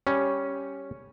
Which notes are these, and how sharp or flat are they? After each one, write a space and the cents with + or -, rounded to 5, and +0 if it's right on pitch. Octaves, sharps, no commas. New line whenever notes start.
G3 +0 C#4 +0